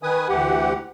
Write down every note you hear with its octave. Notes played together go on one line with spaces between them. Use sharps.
D#3 B4 G#5 D#6
D2 E3 G4 F#5